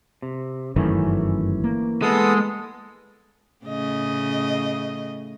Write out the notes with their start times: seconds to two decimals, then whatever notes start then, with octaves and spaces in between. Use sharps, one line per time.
0.22 C3
0.76 G1 F#2 D#3 E3 A3 C#4
1.64 A#3
2.02 G#3 B3 A4 D#6
3.65 A2 C#3 D#5